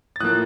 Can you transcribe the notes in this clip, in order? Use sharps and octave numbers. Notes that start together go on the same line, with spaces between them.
A6
A2 F3 A#3 D#6 F#6